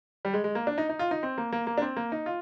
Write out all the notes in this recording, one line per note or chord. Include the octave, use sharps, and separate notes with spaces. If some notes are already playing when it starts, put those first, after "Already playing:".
G3
G#3
G#3
A#3
D4
D#4
D#4
F4
D#4
C4
A#3
A#3
A#3
D4
C4
A#3
D#4
F4